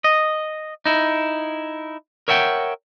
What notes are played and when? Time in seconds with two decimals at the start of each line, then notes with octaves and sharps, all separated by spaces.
0.04 D#5
0.86 D#4 E4
2.28 A#4 C#5 E5 F#5 G5